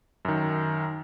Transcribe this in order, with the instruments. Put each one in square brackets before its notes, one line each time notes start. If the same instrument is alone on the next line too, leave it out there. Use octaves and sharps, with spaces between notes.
[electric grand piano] F#2 D#3